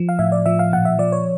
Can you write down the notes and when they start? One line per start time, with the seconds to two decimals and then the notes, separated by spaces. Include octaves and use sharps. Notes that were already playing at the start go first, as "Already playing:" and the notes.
Already playing: F3
0.09 F5
0.19 A2 E5
0.32 D5
0.46 F3 E5
0.59 F5
0.73 A#2 F#5
0.85 E5
0.99 F3 D5
1.12 C#5